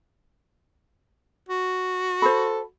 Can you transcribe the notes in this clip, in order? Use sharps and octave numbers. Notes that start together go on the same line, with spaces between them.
F#4
A4 C5 B5